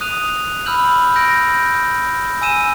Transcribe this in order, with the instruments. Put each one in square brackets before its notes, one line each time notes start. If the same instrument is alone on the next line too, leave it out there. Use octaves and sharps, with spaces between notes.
[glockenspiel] D#6 F#6 D#7 F7
B5 E6 F6 G6 F#7
G6 A#6 D7
G#5 E6 D#7 E7